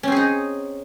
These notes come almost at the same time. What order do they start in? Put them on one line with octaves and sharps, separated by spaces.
C#4 C4 G#4 D#4